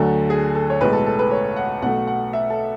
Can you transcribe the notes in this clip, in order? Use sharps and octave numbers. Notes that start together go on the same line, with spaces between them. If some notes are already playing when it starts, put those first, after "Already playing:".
Already playing: D2 D3 F#3 A3 A4
G#4
A4
C#5
B1 A2 G#3 B4
A4
A4
B4
C#5
F#5
B1 B2 A3 F#5
F#5
E5
A4